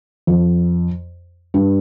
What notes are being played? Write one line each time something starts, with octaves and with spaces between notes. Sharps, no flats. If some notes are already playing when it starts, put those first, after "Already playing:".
F2
G2